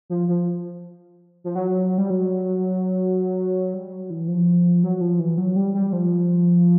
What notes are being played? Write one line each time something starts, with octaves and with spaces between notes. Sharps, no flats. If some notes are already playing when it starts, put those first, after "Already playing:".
F3
F3
F3
F#3
G3
F#3
G3
F#3
E3
F3
F#3
F3
E3
F#3
G3
G3
F3